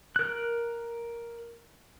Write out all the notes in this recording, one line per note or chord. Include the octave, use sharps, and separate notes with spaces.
A#4 F#6